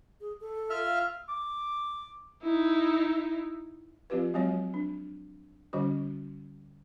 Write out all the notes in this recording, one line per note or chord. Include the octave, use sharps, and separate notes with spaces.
G#4
A4
F4 E5 F6
F5
D6
D#4 E4
F3 C4 F4 G4 B4
F#3 G#3 C4 F#4 C#5
D4
D3 G3 C#4 F#4